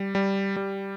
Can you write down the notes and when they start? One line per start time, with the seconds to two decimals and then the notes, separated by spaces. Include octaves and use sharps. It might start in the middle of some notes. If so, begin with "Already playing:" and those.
Already playing: G3
0.15 G3
0.56 G3